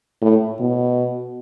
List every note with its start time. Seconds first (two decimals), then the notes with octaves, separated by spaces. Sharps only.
0.22 A2
0.60 B2